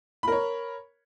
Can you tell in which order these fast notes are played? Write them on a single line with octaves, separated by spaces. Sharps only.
B5 A#4 C#5